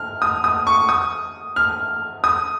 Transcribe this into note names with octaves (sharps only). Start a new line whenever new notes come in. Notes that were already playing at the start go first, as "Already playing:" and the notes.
Already playing: F6
D#6
D#6
C#6
D#6
F6
D#6